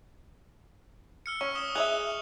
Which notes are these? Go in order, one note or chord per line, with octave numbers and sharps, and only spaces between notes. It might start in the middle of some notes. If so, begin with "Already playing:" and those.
E6 F6 C#7
C#4 C#6
D#6 E7 G7
G#4 D#5 E5 F#6 F7